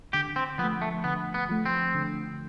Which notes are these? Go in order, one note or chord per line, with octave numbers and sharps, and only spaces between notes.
D3 G4
C4
F3 A3 B3
A3
D3 B3
B3
F3 A3
C4
D3